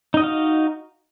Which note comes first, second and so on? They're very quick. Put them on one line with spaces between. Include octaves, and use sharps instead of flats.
D#4 D#5 F#4 F5